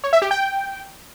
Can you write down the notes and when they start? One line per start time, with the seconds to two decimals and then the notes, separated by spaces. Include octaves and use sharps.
0.04 C#5
0.13 E5
0.22 G4
0.31 G5